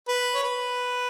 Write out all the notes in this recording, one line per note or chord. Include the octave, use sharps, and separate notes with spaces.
B4
C#5
B4